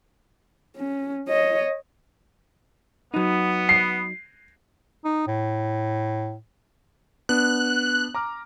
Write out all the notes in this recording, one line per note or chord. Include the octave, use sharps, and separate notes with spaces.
C#4
C#5 D#5
F#3 B3 D#4
C7
D#4
A2
B3 D4 F#6
A#5 D6 F6